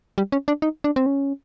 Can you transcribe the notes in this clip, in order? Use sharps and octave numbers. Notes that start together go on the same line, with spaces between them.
G3
C#4
D4
D#4
D4
C4
C#4